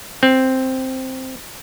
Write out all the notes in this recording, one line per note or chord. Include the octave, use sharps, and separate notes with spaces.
C4